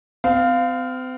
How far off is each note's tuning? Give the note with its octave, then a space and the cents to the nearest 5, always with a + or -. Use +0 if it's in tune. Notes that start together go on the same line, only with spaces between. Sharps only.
C4 -40 F5 +0